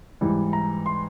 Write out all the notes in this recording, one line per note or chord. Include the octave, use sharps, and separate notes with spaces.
G#2 E3 G3
A#5
C6